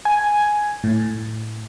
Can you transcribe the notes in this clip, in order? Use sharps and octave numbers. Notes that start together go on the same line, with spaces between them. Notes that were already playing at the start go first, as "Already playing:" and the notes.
G#5
A2